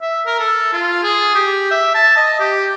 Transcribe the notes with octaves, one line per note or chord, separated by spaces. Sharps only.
E5
A#4
A4
F4
G#4
G4
E5
A5
D#5
G4